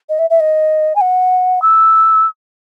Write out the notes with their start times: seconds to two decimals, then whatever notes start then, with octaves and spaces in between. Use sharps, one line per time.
0.09 D#5
0.19 E5
0.30 E5
0.40 D#5
0.95 G#5
1.01 F#5
1.62 E6